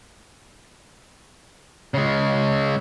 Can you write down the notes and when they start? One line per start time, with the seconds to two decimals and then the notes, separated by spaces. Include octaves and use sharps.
1.94 C#3 G#3